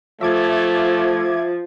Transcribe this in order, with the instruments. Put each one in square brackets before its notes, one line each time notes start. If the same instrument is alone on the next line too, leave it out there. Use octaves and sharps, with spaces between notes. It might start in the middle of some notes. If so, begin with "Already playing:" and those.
[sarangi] F3 [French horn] A3 [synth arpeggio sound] E5 D6 G#6